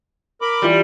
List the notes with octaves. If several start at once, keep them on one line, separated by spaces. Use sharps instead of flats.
A#4 B5 D6
E3 G3 F4